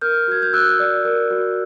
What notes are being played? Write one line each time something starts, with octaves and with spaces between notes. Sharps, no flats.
A#4 F6 G6
F#4 G#6
G6
F#4 E6 F#6
D5
A#4
F#4